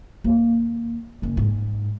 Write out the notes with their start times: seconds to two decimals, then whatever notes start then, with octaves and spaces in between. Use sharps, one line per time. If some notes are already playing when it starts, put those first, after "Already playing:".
0.24 D#2 A#3
1.22 F#1 C#4
1.37 G#2